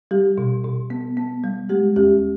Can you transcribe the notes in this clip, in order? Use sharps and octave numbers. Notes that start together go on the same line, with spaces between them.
G3 G4
B2
B2
B3
B3
G3
G#3 G4
D#2 G4